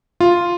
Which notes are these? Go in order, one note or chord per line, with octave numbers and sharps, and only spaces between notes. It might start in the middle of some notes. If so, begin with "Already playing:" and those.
F4